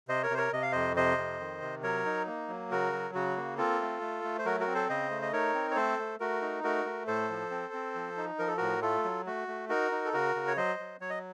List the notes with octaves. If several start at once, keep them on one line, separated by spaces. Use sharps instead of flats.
C3 C5 D#5
A#4 C#5
C3 C5
A#4 C#5
C3 D#5
F5
F2 C5 D#5
C3 C5 D#5
F2
D#3
C3
F#3 A#4 C#5
D#4
A#3
F#3
C#3 F#4 A#4
F#3
C#3 F#4
A#3
C4 F4 A4
A3
A3
A3
C5
F#3 F#4 A#4
F#4 A#4
C4
A4 C5
C#3 C5 D#5
A3
D#5
D#4 A#4 C#5
C4
C#5
A3 A4 C5
A3
A3 F#4 A#4
D#4
A3 F#4 A#4
A3
A2 A4 C5
F3
C4
C4
F3
D#4
F3 A#4
A4
A2 F#4 A#4
A3 F4 A4
F#3
A3 F#4
A3
D#4 F#4 A#4
D#4
A4
C#3 F#4 A#4
C#3
C#5
F#3 C5 D#5
F#3
F#3 C#5
D#5